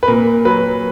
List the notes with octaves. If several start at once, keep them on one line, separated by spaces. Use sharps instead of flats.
B4
A#2 A#4
F#3 B4